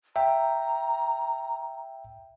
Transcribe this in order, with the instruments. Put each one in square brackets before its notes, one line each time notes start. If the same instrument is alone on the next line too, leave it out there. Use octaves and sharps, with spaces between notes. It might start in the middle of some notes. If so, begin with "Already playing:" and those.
[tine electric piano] E5 G5 [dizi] A#5